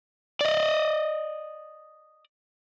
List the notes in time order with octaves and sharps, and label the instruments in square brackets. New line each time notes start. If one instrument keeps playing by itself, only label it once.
[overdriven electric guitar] D5 D#5